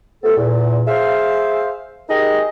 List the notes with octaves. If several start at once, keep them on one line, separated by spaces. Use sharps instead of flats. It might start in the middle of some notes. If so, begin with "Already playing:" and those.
C3 A3 B3 F4 A4
E2 A#2
G#4 C5 E5 F5
D#4 G4 G#4 A#4 D#5